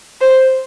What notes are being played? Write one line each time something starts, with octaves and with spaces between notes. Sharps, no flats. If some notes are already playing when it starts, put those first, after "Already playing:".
C5